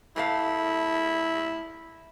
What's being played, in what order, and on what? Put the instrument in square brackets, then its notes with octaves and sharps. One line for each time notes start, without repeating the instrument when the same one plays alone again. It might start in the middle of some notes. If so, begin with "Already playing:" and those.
[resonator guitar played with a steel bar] A2 A3 F5 [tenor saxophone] E4